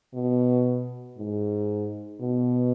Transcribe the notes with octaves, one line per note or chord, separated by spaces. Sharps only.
B2
G#2
B2